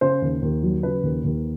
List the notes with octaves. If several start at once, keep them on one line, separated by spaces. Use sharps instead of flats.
C#3 C5
D#2
D#2
F#3
C#3 B4
D#2
D#2